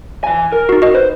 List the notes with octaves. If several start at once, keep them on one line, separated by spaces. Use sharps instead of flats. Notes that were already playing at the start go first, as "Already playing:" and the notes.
E3 G#5
A#4
D#4 F#4
F#4 D#5
B4 C5